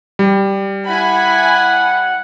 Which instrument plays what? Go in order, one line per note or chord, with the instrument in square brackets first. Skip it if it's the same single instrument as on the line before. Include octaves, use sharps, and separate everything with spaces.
[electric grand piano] G3
[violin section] E4 G#5 B5 [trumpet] F#5